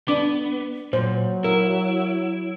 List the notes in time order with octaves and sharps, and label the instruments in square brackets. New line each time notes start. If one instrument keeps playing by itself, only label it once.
[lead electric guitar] B3 [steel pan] D4 D6
[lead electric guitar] A#2 [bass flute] F#3 [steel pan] C5
[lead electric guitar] E4 [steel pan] A#4